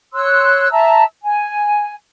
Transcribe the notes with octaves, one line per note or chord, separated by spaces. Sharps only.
C#5 C6 E6 F#6
E5 A5 A#5 E6
G#5